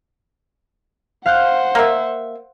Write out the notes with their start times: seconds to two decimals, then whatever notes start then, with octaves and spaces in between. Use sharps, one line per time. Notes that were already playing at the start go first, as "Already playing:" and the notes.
1.26 C5 F5 F#5 F#6 G6
1.75 A#3 E5